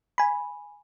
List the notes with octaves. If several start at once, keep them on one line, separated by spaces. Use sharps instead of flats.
G#5 B5